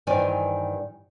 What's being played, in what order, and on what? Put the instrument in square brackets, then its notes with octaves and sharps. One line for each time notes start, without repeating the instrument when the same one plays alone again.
[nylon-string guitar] G2 D#3 E3 C5 D5 G#5